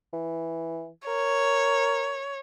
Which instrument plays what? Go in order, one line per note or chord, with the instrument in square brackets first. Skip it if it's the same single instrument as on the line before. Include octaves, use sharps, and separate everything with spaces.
[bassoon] E3
[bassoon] A#4 [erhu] C#5